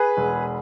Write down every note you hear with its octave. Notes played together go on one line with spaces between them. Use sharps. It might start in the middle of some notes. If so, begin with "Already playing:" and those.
Already playing: G#4 B4
E1